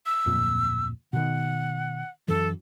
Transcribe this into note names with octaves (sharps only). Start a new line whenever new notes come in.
E6
D1 F2 A#2
B2 D#3 F#5
F#2 E3 A4